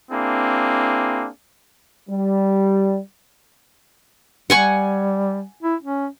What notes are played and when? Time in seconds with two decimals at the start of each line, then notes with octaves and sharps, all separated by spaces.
0.11 A#3 C4 D4 E4 G#4
2.09 G3
4.50 G3 F#5 G#5 C#6
5.63 E4
5.83 C#4